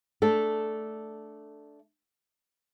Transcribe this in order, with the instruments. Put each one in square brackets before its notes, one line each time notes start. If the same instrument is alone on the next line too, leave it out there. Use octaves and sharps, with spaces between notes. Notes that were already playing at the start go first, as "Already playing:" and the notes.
[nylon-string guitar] A3 D4 A4